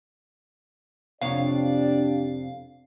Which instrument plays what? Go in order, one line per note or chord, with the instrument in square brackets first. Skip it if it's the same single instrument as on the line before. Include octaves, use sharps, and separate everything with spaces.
[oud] F2 C3 C#5 [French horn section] D4 G4 D5 [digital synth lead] F5